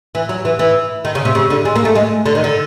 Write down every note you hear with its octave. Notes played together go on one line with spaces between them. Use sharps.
E3
F#3
E3
E3
D#3
C#3
C3
C#3
D3
G#3
A#3
A3
G#3
D3
D#3
D3